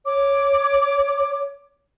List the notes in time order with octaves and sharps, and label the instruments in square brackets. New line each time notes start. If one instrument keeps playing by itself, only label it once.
[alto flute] C#5 [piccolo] D6